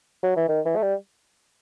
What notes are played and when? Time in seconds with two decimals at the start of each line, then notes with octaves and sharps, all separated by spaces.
0.23 F#3
0.36 E3
0.48 D#3
0.65 E3
0.76 A3
0.82 G3